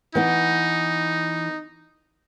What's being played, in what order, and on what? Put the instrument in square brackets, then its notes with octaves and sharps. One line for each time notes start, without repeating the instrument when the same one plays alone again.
[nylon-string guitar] E3 B3 [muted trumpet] D#4